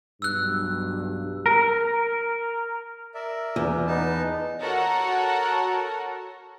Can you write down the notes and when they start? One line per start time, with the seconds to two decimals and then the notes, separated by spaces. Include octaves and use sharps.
0.22 B1 G2 E6 F#6
1.46 A#4
3.14 A#4 D5 E5
3.56 E2
3.87 B3 D#4 A5
4.60 F#4 A4 A#4 C#5 F#5